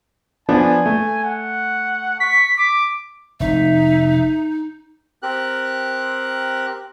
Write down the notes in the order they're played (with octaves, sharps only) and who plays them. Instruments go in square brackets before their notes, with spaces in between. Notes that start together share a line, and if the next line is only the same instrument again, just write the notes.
[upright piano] F3 B3 D4 [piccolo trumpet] G#5
[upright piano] A3
[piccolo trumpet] F#5
[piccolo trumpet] C#6 [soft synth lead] B6
[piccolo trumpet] D6
[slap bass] F1 [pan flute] D#4 [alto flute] E5
[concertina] C4 G4 A#4 F#6